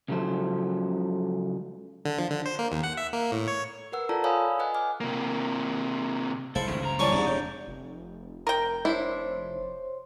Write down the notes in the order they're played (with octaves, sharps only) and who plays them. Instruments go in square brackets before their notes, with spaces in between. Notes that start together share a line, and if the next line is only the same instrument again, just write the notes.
[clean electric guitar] C#2 C#3 F3 F#3 A4 C5
[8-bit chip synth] D3
F3
D3
C5
A#3
D#2
F#5
E5
A#3
A2
C#5
[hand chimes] A#4 B4 F#5 E6
F4 A4 D5 A5 A#5
C#5 F5 G#5 B5 D#6 E6
B4 D#5 F#5 G#5 F#6
G#5 D6 F6
[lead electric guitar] C3 A#3
[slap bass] F1 C2 G#3 [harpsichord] E4 [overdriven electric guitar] A4 [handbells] C5 F5
[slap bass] F#1 C#2 G2 [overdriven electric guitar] D#3 A3
[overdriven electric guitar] F2 A#5
[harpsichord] E3 G3 C#4 [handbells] D5 A5 C#6
[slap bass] E1 E2 D4 [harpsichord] G#2 C3
[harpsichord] A2 [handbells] G6
[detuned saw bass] F1
[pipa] A#4 G5
[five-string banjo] D4 E4 E5 [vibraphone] C5 C#5 C6